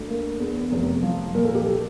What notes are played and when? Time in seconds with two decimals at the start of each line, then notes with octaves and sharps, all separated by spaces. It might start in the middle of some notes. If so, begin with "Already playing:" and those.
Already playing: D2
0.08 A#3
0.39 E2
0.71 F1
1.03 F3
1.35 A#2 A#4
1.45 A4
1.55 G4
1.66 A4